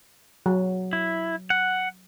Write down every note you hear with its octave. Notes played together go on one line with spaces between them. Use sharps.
F#3
E4
F#5